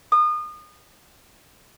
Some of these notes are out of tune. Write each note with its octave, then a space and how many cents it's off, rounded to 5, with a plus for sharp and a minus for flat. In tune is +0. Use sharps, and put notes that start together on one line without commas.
D#6 -30